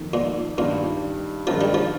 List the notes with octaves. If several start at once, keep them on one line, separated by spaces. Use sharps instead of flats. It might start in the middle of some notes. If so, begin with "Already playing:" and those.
Already playing: F2 D#3 A#3
A#2
G2 A#2 D#3 G3
G2 D#3 F3 G#3 D#4 A#4
G3
F3